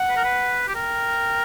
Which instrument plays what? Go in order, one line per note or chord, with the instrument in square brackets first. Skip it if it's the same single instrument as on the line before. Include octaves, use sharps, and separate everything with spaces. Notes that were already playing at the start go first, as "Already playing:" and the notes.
Already playing: [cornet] F#5
[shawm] B4
A#4
B4
G4
[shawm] A#4 [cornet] G5